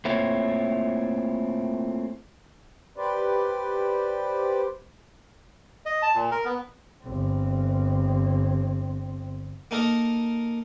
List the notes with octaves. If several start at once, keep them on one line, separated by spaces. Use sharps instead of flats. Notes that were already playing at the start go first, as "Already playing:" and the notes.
A3 A#3 C4 E4 F4 C#5
G4 B4 C5 D5
D#5
A5
A#2
A#4
B3
G1 C4
A#3 D#4 A4 A#4 D#5